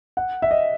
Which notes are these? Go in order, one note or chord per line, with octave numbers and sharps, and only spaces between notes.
F#5
E5
D#5